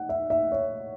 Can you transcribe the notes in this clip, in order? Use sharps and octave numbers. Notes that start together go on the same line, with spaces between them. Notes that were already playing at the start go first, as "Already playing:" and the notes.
Already playing: F#5
E5
E5
C#5